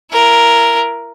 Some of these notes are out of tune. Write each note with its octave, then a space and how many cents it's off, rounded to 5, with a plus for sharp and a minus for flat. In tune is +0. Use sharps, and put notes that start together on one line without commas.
E4 +35 A#4 +0